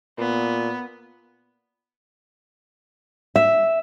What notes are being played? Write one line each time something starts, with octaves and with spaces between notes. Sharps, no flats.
A#2 B3
E5